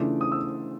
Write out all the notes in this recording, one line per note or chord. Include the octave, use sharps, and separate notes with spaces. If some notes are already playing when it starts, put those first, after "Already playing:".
Already playing: C#3 E3 A3 D4 F4 D6
D#6
E6